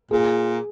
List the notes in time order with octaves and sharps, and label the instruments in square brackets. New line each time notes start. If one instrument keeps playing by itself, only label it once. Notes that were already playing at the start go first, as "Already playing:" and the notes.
[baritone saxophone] A#2 [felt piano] G#4